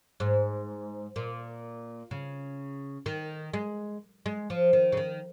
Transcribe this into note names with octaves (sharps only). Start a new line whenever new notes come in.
G#2
A#2
C#3
D#3
G#3
G#3
F3
D#3
C#3
D#3